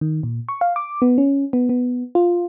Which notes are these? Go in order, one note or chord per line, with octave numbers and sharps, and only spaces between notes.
D#3
A#2
C#6
F5
D6
B3
C#4
B3
B3
F4